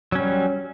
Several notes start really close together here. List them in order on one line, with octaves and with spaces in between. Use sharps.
F#3 C#4 G3